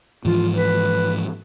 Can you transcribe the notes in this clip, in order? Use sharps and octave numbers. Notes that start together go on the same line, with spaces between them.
G#2 E3 F3 F4
B4